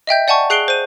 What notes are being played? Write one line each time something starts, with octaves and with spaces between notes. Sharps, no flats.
D#5 E5 G5 G6
D5 F#5 G#5 A5 C#6
G#4 F#6 C7 D7 F#7 G7
C5 D#7